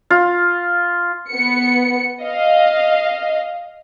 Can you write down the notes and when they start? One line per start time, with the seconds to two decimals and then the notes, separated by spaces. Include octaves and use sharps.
0.10 F4
1.30 B3 C#7
2.22 D#5 F5